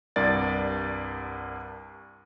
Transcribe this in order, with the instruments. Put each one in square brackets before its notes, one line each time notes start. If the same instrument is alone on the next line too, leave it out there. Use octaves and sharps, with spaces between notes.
[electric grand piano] C2 G2 A#4 D5 A6